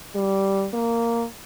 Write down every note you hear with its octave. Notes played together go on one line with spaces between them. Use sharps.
G3
A#3